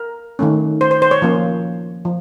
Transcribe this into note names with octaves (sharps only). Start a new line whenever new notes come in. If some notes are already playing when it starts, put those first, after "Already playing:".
Already playing: A#4
D#3 A3 C#4
C5
C5
C5
C#5
F3 A#3 C#4
F3